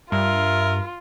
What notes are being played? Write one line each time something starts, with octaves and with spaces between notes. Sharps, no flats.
G2 F4 A#4 E5